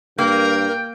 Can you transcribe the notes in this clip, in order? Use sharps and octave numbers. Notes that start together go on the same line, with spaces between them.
G2 A#3 A#4 G5